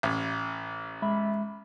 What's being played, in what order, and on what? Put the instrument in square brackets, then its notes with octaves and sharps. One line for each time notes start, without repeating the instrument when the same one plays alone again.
[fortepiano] A1
[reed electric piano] G#3 E5 B5